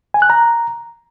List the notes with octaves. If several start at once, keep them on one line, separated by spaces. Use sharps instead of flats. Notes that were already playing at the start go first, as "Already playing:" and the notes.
G#5
F#6
A#5